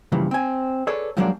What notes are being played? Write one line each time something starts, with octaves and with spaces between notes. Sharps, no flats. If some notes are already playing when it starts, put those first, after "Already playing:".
G2 A#2 C#3 E3 F3
C4 G#5
G#4 A4 B4 C#5 D5
G2 F3 F#3 G#3 A#3 D4